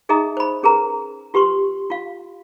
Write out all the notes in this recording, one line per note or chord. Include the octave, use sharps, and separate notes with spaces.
D#4 G#4 D#5 E5 A#5 D#6
C5 B5
C#4 G#4 A#4 B4 A#5
F4 G4 B4 C6 C#6
F4 F5